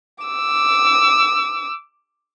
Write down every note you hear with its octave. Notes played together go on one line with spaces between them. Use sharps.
D6 E6